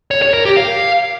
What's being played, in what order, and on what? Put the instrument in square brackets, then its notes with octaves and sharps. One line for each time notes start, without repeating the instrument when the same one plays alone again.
[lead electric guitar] C#5
C#5
A#4
G4
F5